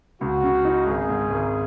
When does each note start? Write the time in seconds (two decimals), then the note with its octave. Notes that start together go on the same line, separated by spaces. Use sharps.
0.21 C#2 F#4
0.43 C#3
0.65 D#4
0.87 G#1 G#4
1.09 G#2
1.30 G#1